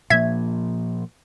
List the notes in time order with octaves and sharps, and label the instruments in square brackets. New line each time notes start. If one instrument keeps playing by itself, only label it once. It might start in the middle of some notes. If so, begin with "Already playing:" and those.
[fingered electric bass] A#2 F3 A#3 [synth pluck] E5 G#6